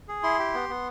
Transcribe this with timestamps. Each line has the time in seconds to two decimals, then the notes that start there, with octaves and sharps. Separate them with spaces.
0.08 G#4
0.23 E4 C6
0.39 G4
0.54 B3
0.69 B3